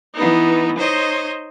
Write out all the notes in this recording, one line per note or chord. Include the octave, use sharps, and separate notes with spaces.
E3 B3 D#4
D#4 C5 C#5 D#5